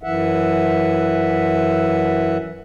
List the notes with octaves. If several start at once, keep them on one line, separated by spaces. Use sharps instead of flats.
F#2 E3 E5 F#5